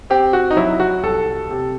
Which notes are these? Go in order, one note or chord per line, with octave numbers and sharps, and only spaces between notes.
C4 G4
F#4
D#4
F#3 E4
F#4
C2 A4
C3